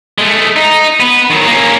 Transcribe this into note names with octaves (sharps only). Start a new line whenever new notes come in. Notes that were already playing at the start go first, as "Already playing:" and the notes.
G#3 A3
D#4
B3 B4
D#3 F#3
A#3 C#4